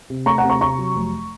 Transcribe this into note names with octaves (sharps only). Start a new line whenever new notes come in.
C3
A3 A#5 C#6
F#5 A#5
C3
A#5 C#6
C3 A#5 C#6
F#3
F1